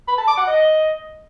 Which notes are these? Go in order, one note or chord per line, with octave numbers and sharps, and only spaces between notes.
B5
A5
D6
F#5
D#5